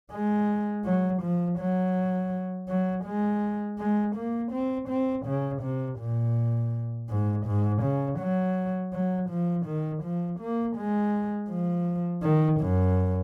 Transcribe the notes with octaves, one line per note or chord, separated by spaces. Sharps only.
G#3
F#3
F3
F#3
F#3
G#3
G#3
A#3
C4
C4
C#3
C3
A#2
G#2
G#2
C#3
F#3
F#3
F3
D#3
F3
A#3
G#3
F3
D#3
F#2